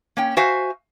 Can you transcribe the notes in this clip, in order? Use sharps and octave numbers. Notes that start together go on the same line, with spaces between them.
A#3 C#4 G5
F#4 C5 E5 F5 G#5